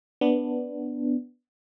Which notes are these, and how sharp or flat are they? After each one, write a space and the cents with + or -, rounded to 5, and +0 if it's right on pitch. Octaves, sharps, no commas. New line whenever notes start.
B3 +0 D4 +0